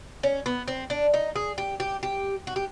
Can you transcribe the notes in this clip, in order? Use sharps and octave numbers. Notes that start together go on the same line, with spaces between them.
C#4
B3
C4
D4
D#4
G#4
G4
G4
G4
F#4
G4